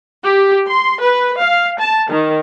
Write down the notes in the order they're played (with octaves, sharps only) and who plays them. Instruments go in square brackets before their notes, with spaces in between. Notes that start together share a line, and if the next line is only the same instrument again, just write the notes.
[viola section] G4
C6
B4
F5
A5
D#3